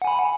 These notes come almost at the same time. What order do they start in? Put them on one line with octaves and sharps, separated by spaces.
F#5 G#5 B5